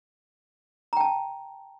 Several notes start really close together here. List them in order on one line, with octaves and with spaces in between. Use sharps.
A#5 G5 A5